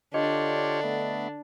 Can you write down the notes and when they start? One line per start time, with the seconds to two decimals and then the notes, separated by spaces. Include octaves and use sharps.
0.14 D3 D4 F4 G4 C#5 D#5
0.83 A3 B3